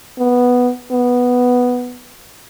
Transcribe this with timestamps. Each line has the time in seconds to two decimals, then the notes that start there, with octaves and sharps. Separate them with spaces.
0.18 B3
0.92 B3